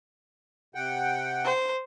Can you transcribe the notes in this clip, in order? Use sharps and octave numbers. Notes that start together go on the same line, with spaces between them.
C3 F#5 G5
C5